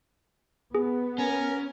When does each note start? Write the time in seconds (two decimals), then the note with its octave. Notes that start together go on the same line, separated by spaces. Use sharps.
0.75 B3 G#4
1.18 C#4 A#4 G#5